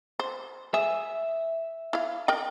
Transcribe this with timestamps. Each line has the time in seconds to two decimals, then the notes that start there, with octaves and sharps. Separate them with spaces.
0.20 C5
0.74 G#4 E5
1.93 E4 F5
2.28 A#4 D#5 G5